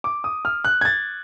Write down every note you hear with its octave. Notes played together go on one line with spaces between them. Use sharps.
D6
D#6
F6
F#6
G#6
A6